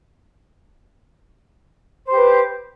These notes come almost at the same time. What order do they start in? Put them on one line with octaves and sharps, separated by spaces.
C5 G4 B4